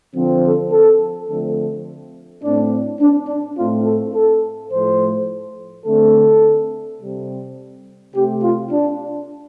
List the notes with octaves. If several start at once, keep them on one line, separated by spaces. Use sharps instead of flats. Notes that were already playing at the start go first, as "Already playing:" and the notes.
D3 F3 C4
A4
A4
D3 F3 A3 C4 A4
A2 A3 C4 D4
D4
D4
A2 A3 C4 F4
A4
A4
A2 F3 A3 C5
D3 A3 C4 A4
C3 G3 C4
C3 A3 C4 G4
F4
D4